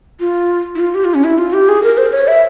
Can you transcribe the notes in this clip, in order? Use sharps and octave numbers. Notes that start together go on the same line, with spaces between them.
F4
E4
F4
G4
F4
C#4
E4
F4
G4
G#4
A#4
C5
C#5
E5